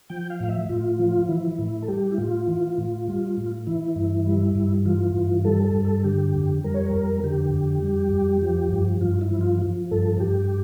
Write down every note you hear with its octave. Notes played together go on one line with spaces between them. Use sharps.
F3 G5
F5
A2 F5
E5
A2 F4
F3
E3 E4
A2
A4
G3 G4
E4
A2 F4
E3
A2
G3
A2
E3 E4
G2
G3
G2
E3 F4
G2
G3 A4
A4
G2
A4
D3 G4
F2
G3 A#4
C#5
A#4
F2
D3 G4
F2
G3
F2
F3
G2
G2 F4
E4
F3
F4
F3
G2 A4
G2 G4